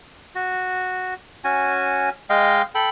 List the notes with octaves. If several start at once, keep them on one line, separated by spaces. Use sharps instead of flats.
F#4
C#4 F#4 G#5
G#3 D#5 F5 G5
A4 G5 B5